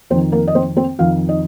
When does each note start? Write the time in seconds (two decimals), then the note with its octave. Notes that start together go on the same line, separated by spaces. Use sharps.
0.10 F2 C4 C5
0.14 D#3
0.32 A#3 A#4
0.48 D#5
0.55 C4 C5
0.76 C4 C5
0.99 F2 D#3 F4 F5
1.29 D#4 D#5